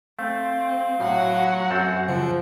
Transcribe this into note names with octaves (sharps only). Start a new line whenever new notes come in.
A3 C4 F5
A2 F#3 F#4 F#5
F#2 C4 A4
C#3 F3